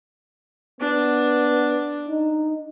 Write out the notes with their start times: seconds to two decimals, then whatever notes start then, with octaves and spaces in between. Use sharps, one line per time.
0.81 B3 D4
2.08 D#4